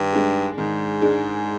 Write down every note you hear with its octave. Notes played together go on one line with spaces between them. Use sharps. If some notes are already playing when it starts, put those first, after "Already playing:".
Already playing: G2 D#3
G#3 D4 G#4
G#2 D#3
G#3 D4 G#4